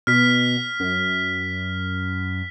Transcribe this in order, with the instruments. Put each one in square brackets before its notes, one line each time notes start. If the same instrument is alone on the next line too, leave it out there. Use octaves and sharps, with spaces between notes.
[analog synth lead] B2 [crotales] F6 B6
[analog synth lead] F#2